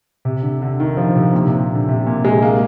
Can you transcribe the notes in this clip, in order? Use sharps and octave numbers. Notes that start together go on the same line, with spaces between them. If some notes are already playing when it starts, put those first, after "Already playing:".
C3
D3
D3
D#3
F3
C3
A#2
C3
D3
C3
A#2
G#3
A#3